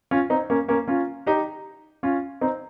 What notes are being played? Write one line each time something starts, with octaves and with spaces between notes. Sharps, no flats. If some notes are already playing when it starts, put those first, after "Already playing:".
C#4 F4
C4 D#4
A#3 C#4
A#3 C#4
C#4 F4
D#4 G4
C#4 F4
C4 D#4